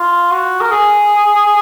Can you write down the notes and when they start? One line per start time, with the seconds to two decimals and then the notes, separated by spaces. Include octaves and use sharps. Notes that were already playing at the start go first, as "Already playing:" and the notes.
Already playing: F4
0.31 F#4
0.61 A#4
0.71 G#4